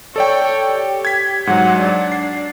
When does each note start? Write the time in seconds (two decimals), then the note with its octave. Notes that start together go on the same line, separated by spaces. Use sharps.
0.16 A4 C#5 D5 G5
0.68 G4
1.05 G#6 B6
1.47 G#2 F#3 F#5
1.80 D4
2.12 C7